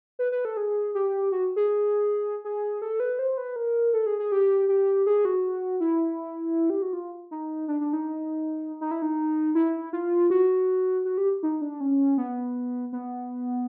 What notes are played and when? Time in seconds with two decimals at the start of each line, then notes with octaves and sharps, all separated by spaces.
0.19 B4
0.32 B4
0.45 A4
0.57 G#4
0.95 G4
1.32 F#4
1.56 G#4
2.45 G#4
2.82 A4
3.00 B4
3.19 C5
3.38 B4
3.56 A#4
3.93 A4
4.06 G#4
4.19 G#4
4.32 G4
4.69 G4
5.06 G#4
5.25 F#4
5.80 E4
6.70 G4
6.82 F#4
6.93 F4
7.31 D#4
7.68 D4
7.81 D4
7.93 D#4
8.81 D#4
8.91 E4
9.02 D#4
9.55 E4
9.93 F4
10.30 F#4
11.05 F#4
11.18 G4
11.43 D#4
11.61 D4
11.81 C#4
12.18 B3
12.93 B3